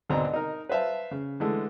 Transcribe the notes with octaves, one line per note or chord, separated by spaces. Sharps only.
G#1 D2 B2 C4 D4 A#5
D#4 A#4
B4 C5 E5 F5 A5
C#3
D3 E3 G#3 A3 A4